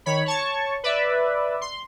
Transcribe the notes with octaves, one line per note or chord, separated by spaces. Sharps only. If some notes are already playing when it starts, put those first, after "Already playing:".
D#3 C#5 B5
C#5 A5 C#6
B4 D5 E5
C6